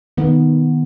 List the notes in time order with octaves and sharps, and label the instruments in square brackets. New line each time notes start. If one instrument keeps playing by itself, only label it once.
[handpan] D#3 B3